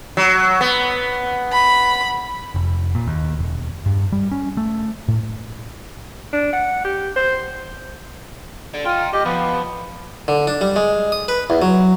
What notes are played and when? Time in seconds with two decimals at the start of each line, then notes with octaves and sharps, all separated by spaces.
0.17 F#3
0.61 B3
1.53 B5
2.55 F1
2.95 A#2
3.07 D#2
3.39 E1
3.86 G2
4.12 G3
4.31 C#4
4.57 A3
5.08 A2
6.33 D4
6.53 F#5
6.85 G4
7.16 C5
8.74 A4 D5
8.86 F4 D#5 G5
9.13 G4 D#5
9.25 F3 B3
10.28 D3
10.47 D4
10.61 G3
10.76 G#3
11.12 D#6
11.28 B4
11.50 E2
11.62 F#3